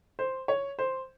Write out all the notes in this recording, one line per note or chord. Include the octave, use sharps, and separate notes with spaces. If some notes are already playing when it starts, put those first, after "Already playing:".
C5
C#5
C5